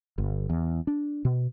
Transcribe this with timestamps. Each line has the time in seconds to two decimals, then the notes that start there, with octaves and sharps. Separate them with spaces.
0.18 G1
0.50 E2
0.87 D4
1.25 B2